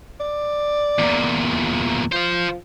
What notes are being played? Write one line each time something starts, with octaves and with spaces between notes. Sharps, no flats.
D5
E2 A#2
F3 C5 F5